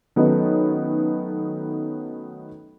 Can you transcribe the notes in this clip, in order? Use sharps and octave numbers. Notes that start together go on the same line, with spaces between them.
D#3 F#3 A3 B3 C#4 D#4